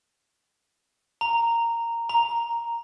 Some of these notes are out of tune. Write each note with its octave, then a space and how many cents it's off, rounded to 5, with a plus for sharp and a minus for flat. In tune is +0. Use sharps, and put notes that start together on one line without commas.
A#5 -10
A#5 +0